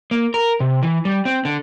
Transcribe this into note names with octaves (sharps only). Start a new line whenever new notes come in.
A#3
A#4
C3
E3
G3
C4
D3